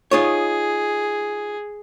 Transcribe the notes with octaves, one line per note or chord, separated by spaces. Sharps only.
D#4 F4 G#4 C#5